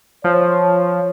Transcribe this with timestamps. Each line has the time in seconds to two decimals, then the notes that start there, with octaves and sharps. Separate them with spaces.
0.24 F3 C#5